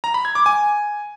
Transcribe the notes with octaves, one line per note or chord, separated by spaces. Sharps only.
A#5
B5
G#6
D6
G#5